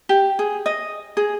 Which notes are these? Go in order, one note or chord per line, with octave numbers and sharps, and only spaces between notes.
G4
G#4
D#5
G#4